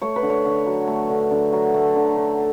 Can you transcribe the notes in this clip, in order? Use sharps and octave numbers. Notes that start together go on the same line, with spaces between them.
A3 C#5
B4
D3
C#5
D3
F#3
A3
D3
D3
F#3
A3
D3
D3